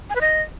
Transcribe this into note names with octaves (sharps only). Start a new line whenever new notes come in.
G#5
B4
D#5